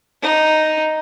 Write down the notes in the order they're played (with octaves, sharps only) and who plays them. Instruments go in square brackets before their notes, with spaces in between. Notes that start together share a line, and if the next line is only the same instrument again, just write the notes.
[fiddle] D#4